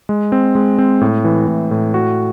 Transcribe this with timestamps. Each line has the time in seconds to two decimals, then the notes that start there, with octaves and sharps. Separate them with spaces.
0.09 G#3
0.32 C4
0.55 G#3
0.78 C4
1.01 A2
1.25 E3
1.47 A2
1.71 A2
1.94 F#4